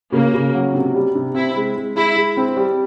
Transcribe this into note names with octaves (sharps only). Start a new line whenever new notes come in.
C#3 A#3
C#3
F#3
C3
G3
C3
C4 E4
G#3
G#3
G#3 E4
G#3
C4
G3